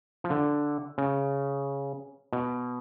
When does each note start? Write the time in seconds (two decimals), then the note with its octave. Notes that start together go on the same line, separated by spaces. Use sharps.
0.24 F3
0.30 D3
0.98 C#3
2.33 B2